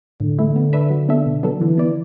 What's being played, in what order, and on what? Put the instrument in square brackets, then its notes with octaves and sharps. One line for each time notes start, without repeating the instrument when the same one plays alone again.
[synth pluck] A2 [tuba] D3
[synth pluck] E3 A3 E4
B3
D4 B4 E5
F#3
B3 D4 A4 E5
B2
F#3 B3 D4 A4
[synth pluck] D3 [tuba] E3
[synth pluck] B3 E4 D5